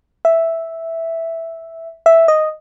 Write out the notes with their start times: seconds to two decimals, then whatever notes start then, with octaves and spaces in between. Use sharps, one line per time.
0.25 E5
2.06 E5
2.28 D#5